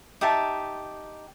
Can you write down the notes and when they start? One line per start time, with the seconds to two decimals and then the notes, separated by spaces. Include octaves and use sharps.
0.21 D#4 G4 E5 A5